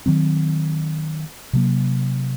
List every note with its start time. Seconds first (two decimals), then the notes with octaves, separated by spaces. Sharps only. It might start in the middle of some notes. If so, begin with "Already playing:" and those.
0.06 D#3 F#3 C4
1.53 C3 F#3 A#3